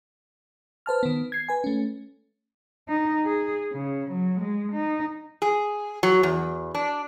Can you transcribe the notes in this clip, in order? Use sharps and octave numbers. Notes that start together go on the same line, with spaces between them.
B4 C5 A5 F6
D#3 B3
G#6 C7
B4 G#5
A3 C#4
D#4
G#4
C#3
F#3
G#3
D#4
G#4
F#3
E2
D4